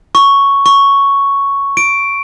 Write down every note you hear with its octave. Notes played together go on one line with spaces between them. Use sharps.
C#6
C#6
D7